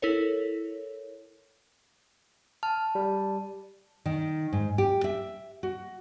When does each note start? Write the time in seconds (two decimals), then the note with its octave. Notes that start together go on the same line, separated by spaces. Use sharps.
0.02 E4 A4 A#4 C#5
2.63 A5 F6
2.95 G3
4.06 D#3
4.53 G#2
4.78 G4
5.04 E5
5.63 F#4